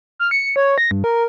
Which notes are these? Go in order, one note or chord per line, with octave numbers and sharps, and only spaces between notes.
F6
C#7
C#5
A#6
G2
A#4